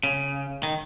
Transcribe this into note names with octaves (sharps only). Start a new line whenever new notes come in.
C#3
D#3